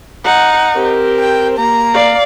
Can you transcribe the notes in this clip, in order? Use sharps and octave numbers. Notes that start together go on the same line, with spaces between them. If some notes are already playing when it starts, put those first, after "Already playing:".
D#4 F#5
C4 G4 A#4
G5
A#3 A#5
D5 F5